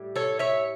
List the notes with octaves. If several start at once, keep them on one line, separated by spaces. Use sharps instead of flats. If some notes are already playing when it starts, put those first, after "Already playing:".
Already playing: A2 G3
A4 C#5
C#5 E5